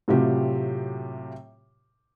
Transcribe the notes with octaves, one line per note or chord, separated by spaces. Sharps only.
A2 C3 F#3 F4 G4